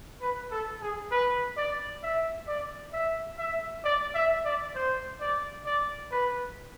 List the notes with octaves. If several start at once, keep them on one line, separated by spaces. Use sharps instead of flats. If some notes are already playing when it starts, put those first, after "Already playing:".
B4
A4
G#4
B4
D5
E5
D5
E5
E5
D5
E5
D5
C5
D5
D5
B4